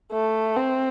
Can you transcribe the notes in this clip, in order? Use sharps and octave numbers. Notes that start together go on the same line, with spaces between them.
A3
C4